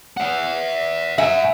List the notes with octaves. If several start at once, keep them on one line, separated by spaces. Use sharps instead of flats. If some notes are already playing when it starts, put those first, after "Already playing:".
E5 F#5
E5 F#5 G#5